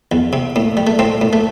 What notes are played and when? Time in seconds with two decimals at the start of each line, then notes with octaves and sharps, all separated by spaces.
0.12 E2
0.33 C3
0.56 A2
0.77 G3
0.87 A3
0.99 A2 C4
1.21 A2
1.33 A3